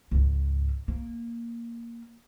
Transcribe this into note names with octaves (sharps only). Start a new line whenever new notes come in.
C#2 G#2
A#3